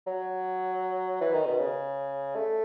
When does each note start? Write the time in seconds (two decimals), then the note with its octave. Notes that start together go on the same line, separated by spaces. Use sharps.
0.07 F#3
1.21 E3
1.33 D#3
1.46 B2
1.59 C#3
2.35 A3